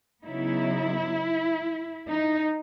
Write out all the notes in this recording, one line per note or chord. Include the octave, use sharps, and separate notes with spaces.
C#3 F#3 B3 D#4 E4
D#4